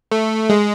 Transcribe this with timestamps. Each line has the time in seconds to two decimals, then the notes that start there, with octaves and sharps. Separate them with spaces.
0.12 A3
0.49 G#3